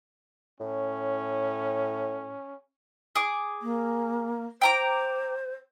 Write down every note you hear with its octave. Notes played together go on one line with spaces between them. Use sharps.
A2 C#4
G#4 D6
A#3
C5 G5 A#5 D6